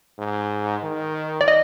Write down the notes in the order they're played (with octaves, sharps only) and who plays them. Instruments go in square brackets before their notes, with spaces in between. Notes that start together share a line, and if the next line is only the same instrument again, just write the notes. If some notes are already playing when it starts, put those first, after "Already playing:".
[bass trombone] G#2
D#3
[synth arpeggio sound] D5
D#5